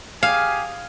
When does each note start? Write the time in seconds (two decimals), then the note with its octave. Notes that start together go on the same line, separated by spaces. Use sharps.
0.23 G4 G#4 F5 G#5